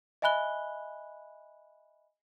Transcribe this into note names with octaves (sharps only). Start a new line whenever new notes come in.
D#5 E5 G#5 B5 F#6 G7